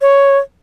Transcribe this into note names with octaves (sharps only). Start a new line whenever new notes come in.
C#5